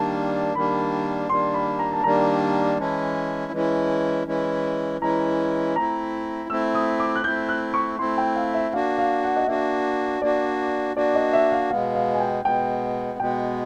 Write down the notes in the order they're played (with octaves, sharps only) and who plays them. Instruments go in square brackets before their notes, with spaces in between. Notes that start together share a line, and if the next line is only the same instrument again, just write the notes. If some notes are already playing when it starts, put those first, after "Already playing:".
Already playing: [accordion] D#3 G3 A#3 D4 [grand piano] A5
[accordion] D#3 G3 A#3 D4 [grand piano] B5
[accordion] D#3 G3 A#3 D4 [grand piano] C6
[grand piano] B5
A#5
A5
[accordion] D#3 G3 A#3 D4 [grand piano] A#5
[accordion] E3 G#3 C#4 E4 [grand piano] A5
[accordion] E3 G#3 C#4 E4
E3 G#3 C#4 E4
[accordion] E3 G#3 C#4 E4 [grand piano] A#5
[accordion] A3 C4 E4 [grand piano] A#5
[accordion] A3 C4 E4 [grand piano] E6
[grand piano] D#6
D6
F#6
[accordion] A3 C4 E4 [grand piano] G6
[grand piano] F#6
C#6
[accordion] A3 C4 E4 [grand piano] C6
[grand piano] G5
F5
E5
[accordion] A#3 D4 F#4 [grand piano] F5
[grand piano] F5
F#5
D#5
[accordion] A#3 D4 F#4 [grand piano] E5
[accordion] A#3 D4 F#4 [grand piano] D5
[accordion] A#3 D4 F#4 [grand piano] D5
[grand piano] D#5
E5
F5
[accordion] B2 G#3 B3 [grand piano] F5
[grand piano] F5
G#5
G5
[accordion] B2 G#3 B3 [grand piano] G5
[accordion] B2 G#3 B3 [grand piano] G5